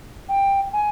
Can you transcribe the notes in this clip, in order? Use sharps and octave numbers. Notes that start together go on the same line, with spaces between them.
G5
G#5